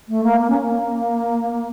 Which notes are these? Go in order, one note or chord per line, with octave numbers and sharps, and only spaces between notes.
A3
A#3
A#3
C#4
A#3